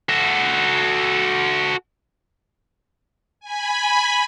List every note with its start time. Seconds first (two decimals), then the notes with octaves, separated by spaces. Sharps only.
0.09 F#4 A4
3.40 G#5 B5